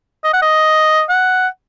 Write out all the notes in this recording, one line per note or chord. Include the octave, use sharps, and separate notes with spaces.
D#5
F#5
D#5
F#5